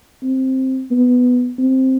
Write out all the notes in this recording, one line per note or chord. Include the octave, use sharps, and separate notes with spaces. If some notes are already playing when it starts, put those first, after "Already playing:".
C4
B3
C4